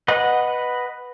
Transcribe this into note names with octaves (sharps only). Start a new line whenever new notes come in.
B4 D#5 F#5